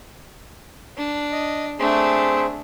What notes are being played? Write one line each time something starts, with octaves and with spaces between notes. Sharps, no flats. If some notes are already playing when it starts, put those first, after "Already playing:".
D4
D#5
A3 C4 D4 G#4